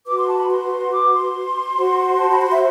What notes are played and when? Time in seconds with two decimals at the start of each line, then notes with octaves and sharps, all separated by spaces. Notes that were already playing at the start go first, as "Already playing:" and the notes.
0.07 F#4 B4 D6
0.18 C6
0.28 A5
0.39 B5
0.50 C6
0.92 D6
1.13 C6
1.77 F#4 C5
2.19 A5
2.31 B5
2.42 C6
2.51 E5